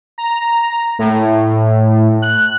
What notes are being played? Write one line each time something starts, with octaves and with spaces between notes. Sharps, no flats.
A#5
A2
F#6